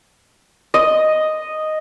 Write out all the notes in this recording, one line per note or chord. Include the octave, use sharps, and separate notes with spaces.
D#5